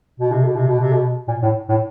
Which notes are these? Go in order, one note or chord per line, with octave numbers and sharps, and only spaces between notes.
B2
C3
B2
C3
B2
C3
B2
A#2
A2
A2